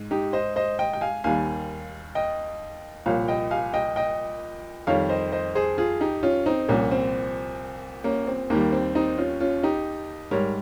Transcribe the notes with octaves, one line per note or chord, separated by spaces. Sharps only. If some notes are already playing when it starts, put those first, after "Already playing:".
Already playing: G#2
D#4 G4
C5 D#5
C5 D#5
D#5 G5
G5
F5 G#5
D#2 D#3 G3 F5 G#5
D#5 G5
C2 A#2 F3 C#5 F5
D#5 G5
F5 G#5
D#5 G5
D#5 G5
F2 D#3 G3 C#5 F5
C5 D#5
C5 D#5
G#4 C5
F4 G#4
D#4 G4
C#4 F4
C4 D#4
C2 A#2 F3 A#3 C#4
C4
A#3 C#4
C4
D#2 D#3 G3 A#3
C4
C4 D#4
C#4 F4
C#4 F4
D#4 G4
G#2 G3 A#4 C#5